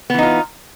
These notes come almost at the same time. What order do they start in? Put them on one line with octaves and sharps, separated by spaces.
B3 E3 D#4 F4